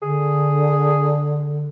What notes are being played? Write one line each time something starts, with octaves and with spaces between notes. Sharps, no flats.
D3 G#4